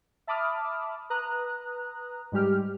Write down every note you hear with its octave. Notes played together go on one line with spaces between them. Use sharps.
E5 A5 B5 D6 D#6 F6
B4 A#5 D#6 F#6
G#2 G3 G#3 G4 F6